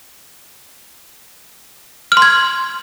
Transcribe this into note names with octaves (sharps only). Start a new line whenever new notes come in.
F6
C6
G#6